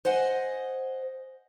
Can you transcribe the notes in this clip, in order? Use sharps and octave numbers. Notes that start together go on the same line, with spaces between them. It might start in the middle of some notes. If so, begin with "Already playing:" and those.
C5 D#5 F#5 G#5